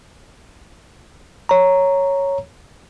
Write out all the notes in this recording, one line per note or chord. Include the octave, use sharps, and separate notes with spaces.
C#5 A#5